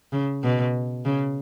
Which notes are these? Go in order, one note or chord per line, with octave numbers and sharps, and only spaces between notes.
C#3
B2
C#3